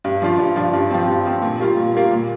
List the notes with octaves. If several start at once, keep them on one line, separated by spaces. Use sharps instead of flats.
G2
F3 D4 F4
G2
F3 D4 F4
G2
F3 C4
G2
F3 C4
A#2
G3 A#3 F4
A#2
G3 A#3 F4
A#2